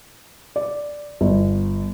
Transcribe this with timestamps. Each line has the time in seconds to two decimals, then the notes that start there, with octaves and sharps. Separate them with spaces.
0.56 D5
1.21 G1